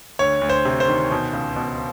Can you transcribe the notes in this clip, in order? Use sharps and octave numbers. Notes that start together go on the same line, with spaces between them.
D2 C#5
D2
C5
C3
C5
D#3
B2
C#2
B2